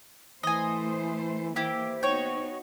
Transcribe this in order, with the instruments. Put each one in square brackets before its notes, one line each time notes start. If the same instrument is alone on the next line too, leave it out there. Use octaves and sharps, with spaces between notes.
[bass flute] E3 [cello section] A3 C5 [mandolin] D#5 G#5
[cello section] E3 A#3 [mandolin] E4 G4 [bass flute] C5
[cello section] B3 D#4 F#4 [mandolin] C#5 G5